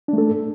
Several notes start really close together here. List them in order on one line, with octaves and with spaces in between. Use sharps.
D4 A3 A4